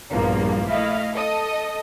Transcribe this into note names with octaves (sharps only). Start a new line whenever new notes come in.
A#1 E2 G2 F3 A#3
A3 E4 D#5 F5
A4 D#5 D#6